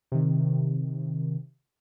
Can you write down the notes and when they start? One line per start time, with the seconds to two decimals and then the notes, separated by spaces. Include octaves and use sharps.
0.12 C3 D#3